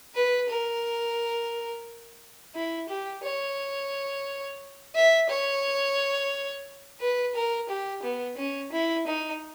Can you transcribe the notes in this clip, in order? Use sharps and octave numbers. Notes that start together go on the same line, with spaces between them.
B4
A#4
E4
G4
C#5
E5
C#5
B4
A#4
G4
B3
C#4
E4
D#4